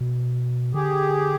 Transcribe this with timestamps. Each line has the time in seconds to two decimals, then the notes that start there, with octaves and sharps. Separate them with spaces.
0.01 B2
0.74 D3 G4 G#4